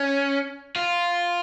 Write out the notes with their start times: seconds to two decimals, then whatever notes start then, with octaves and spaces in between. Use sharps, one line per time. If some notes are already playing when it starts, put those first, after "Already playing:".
Already playing: C#4
0.76 F4